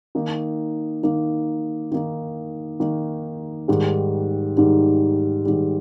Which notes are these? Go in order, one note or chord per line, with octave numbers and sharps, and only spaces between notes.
D#3 A#3 D#4
D#3 A#3 D#4
D#3 A#3 D#4
D#3 A#3 D#4
G#2 D#3 G3
G#2 D#3 G3
G#2 D#3 G3